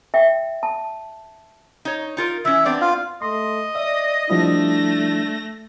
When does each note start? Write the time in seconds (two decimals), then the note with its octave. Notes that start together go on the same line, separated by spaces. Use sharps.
0.14 E5 G5
0.63 A5
1.85 D#4 C#5
2.17 D#4 F4 A#4
2.45 E3 C#4 E5
2.65 B3 C4 D4 D5
2.81 F4 F5
3.22 A3 D#5 C6
3.75 D5 E5 D#6
4.30 F3 G3 A3 D4 E4 A#6